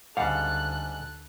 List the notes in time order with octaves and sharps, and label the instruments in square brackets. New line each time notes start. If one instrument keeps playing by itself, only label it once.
[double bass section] D2 [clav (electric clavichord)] G#2 C#3 G3 [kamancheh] A4 F#6 [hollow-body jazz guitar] F5 F#5